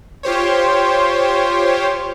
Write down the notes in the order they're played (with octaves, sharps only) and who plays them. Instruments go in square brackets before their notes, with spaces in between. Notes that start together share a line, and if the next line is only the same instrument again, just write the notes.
[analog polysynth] F4 G4 C5 C#5